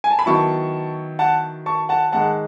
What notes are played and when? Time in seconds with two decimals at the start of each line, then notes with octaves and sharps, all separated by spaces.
0.04 G#5
0.11 A5
0.19 B5
0.26 D#3 F#3 B3 E4 A5 C#6
1.19 F#5 A5
1.66 A5 C#6
1.89 F#5 A5
2.12 G#2 D#3 G#3 D#4 F#5 A5